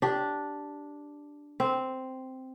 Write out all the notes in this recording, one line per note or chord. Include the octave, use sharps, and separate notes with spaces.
D4 G4
C4